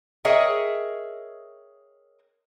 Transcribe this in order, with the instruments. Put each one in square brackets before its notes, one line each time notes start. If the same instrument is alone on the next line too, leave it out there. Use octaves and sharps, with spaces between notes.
[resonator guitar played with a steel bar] G#4 A#4 C#5 D#5 E5 G5